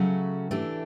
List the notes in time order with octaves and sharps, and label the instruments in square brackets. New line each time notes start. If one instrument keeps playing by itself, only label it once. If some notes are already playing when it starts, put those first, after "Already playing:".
Already playing: [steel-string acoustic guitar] C#3 F#3 A3 C#4 F#4
E3 A3 D4 G4